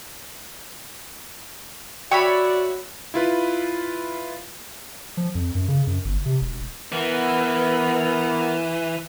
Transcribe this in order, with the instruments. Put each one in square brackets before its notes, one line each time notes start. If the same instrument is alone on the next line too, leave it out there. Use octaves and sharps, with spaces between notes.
[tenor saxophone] F#4 [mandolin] C#5 E5 B5 [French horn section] D5 [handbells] G5
[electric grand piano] E4 F4 B4
[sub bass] F3
F2
F#2
C#3
F#2
G1
C3
E1
[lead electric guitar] E3 [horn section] B3 A#4